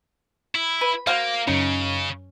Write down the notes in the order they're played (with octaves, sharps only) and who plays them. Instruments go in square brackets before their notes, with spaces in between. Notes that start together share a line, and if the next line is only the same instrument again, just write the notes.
[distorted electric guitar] E4 [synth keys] B5
[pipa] B4
[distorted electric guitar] A#3 [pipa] F#4 C5 F5
[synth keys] F#2 C#4 [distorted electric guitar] C#3 [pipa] D#4